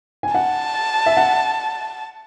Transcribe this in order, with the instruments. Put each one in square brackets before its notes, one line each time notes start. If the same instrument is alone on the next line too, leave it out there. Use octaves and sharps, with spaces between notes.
[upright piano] G#5
[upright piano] F#5 [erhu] A5
[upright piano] E5
F#5